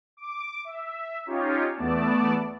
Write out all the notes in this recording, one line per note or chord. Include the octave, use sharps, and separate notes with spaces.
D6
E5
C#4 D#4 F4 G4 C#5
E2 A3 B3 D5 A5